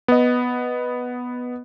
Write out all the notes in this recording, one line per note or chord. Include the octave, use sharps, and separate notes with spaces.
B3 D#5